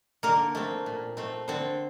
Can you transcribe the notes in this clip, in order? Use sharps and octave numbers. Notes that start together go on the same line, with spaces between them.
D3 A#3 A#4
A3 C4
A#2
A3 C4
D3 C4 C5